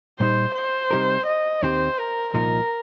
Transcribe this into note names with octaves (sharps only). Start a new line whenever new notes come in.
A#2 G3 D#4 C5
C5
C3 G3 D#4 G4 A#4
D#5
D#2 D#3 C4 G4 C5
A#4
C2 A#2 F3 D#4 A#4